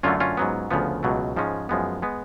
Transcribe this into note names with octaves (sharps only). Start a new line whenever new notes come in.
F#2 D3 F#3 A3 C#4 F4
C#4 F4
G#2 F#3 B3
D2 C#3 F3 B3
C#2 B2 F#3 A3
G#2 F3 G#3 C#4
F#2 F3 G#3 B3
G#3 B3